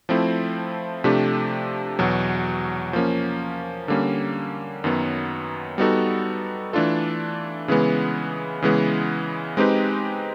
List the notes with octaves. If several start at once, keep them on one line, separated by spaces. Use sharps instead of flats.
F3 A3 C4 E4
C3 F3 A3 D4 G4
E2 B2 F#3
F3 A#3 C#4
D3 G3 A#3 C#4
F#2 D#3 F#3 B3
G3 B3 D#4 F#4 A4
E3 A3 D4 F4 A4
C#3 E3 G#3 B3
C#3 E3 G#3 B3
G#3 C4 D#4 G4 B4